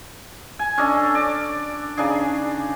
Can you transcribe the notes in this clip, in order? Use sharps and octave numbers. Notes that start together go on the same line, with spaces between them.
G#5
C#4 D4 A4 D#5
D5
C#3 D4 D#4 G#4